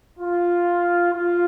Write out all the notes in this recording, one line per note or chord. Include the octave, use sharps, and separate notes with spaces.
F4
F4